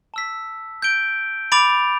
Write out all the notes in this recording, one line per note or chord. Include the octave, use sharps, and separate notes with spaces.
A5 E6 B6
G6 D7 G7
B5 D6 A6 D7 F7